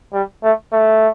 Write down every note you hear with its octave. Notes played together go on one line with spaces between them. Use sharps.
G3
A3
A3